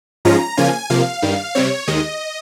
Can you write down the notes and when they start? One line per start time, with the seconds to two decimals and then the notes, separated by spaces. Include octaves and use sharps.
0.25 G#2 F3 G#3 C#4 F4 A#5
0.57 C#3 F3 A#3 C#4 F4 G#5
0.90 C3 F3 A#3 F5
1.22 G2 D#3 G3
1.55 C3 G3 C4 C#5
1.88 D#2 D#3 G#3 D#5